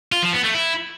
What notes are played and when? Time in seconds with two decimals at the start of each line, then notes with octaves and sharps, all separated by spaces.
0.12 F4
0.23 F3
0.33 B3
0.44 A3
0.54 E4